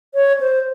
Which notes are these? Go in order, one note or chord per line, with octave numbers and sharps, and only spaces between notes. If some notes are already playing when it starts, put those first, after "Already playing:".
C#5
C5